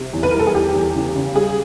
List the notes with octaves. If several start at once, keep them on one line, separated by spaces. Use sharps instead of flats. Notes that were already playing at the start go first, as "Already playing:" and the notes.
Already playing: C3
E2
B4
G3 A#4
A4
G#4
E2 G4
E2
C#3
C#3
G3 G#4